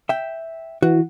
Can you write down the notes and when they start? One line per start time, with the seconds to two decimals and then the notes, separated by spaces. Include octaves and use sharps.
0.09 E5 G5
0.82 E3 F#4